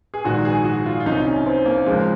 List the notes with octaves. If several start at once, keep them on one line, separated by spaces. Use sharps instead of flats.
G#4
A#1 G#2 D#3 F#4
G#4
F#4
F4
F4
C2 C3 F#3 D#4
C#4
C4
A#3
C#2 C#3 F3 G#3